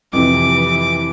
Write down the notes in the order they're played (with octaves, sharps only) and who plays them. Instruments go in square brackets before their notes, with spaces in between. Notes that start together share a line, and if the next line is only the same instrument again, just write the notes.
[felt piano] F2 C3 [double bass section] E3 [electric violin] D6